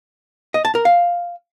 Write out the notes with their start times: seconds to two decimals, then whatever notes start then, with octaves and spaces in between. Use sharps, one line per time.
0.54 D#5
0.65 A5
0.75 A#4
0.85 F5